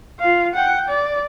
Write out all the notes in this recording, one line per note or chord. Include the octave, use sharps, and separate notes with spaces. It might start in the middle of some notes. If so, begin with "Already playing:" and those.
F4 F5
F#5 G5
D5